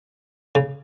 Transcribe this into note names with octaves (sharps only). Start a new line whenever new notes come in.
C#3